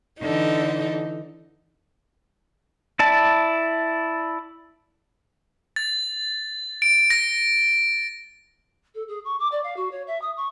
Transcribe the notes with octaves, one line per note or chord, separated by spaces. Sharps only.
D3 E3 D#4 A4
E4 D5 A5
A6
D7
A#6
A4
G#4
C#6
D6
D5
F5
F#4
C#5
E5
D#6
C#6